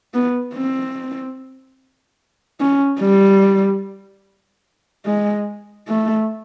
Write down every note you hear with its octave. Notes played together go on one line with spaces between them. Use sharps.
B3
C4
C#4
G3
G#3
A3